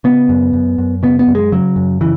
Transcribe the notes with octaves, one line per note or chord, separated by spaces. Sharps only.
C#3 B3
F#2
F#2
F#2
C#3 B3
B3
F#2
G#3
C#3 F#3
F#2
C#3 E3